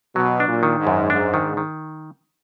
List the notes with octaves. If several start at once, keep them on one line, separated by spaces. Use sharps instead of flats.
B2 F#3
D4
A#2
D#3
G#2
F#2
G#2 D4
D#3
D#3